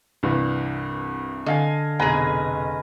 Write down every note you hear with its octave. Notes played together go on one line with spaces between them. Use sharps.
C2 G2 E3
D3 D#5 F5 G#5
F1 B1 G#4 B4 G5 G#5 A#5